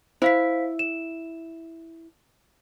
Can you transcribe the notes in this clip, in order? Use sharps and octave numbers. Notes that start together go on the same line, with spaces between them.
E4 C5 F5 B6
E7